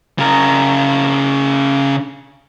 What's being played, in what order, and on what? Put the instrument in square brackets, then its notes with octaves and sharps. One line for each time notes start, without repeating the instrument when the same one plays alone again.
[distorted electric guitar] C#3 A#4